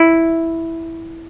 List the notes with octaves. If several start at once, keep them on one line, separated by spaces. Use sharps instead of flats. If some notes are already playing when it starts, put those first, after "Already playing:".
Already playing: E4